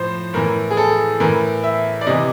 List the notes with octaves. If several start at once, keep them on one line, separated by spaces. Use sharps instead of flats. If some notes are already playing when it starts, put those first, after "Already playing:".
Already playing: A2 F3 C5
A2 E3 A#4
G#4
A4
A2 E3 A#4
E5
D5
C3 E3 D#5